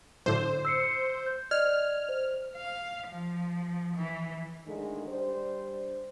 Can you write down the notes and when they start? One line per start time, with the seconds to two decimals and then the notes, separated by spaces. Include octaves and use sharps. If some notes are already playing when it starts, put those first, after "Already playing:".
0.26 F#2 A2 D3 C5
0.65 E6 C7 C#7
1.26 G6
1.51 D5 D#5 F6 G#6
2.09 C5
2.56 F5
3.08 F3
3.96 E3
4.65 A2 D3 D#3 G#3 G#4
5.08 G3 D4 C5